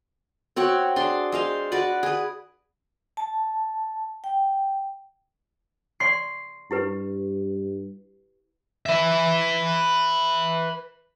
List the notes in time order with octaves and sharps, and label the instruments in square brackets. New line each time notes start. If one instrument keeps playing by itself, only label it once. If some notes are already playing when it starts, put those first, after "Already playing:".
[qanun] C4 F#4 C#5 F#5
D4 G#4 C6
G#3 C5 F5
F#4 B4 D5 F#5
G#4 B4
[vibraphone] A5
G5
[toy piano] D5 C6 C#6 [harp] C7
[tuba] G2 [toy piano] E4 G4 B4
[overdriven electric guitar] B4 E5